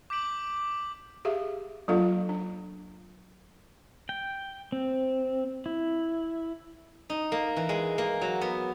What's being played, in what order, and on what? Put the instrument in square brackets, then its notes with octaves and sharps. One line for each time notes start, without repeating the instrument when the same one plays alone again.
[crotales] D6 G6 B6 D7 F#7
[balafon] G4 G#4 E5 F5
F#3 A#3 D4 F4 A4 F5
D4
[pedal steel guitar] G5
C4
E4
[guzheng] D#4
A#3
E3
G#3
A#3
F#3
B3